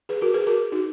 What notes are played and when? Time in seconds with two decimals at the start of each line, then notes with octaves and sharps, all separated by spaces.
0.09 G#4 B4
0.22 F#4 A#4
0.34 G#4 B4
0.47 F#4 A#4
0.72 D#4 F#4